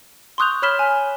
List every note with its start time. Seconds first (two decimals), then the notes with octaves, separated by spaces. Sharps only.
0.38 C6 C#6 D#6 F#6 G6 F7
0.62 C#5 B5 F6 B6 E7 G7
0.79 G#5